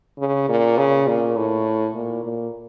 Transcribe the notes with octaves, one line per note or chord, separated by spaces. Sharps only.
C#3
A#2
C#3
A#2
A2
A#2
A#2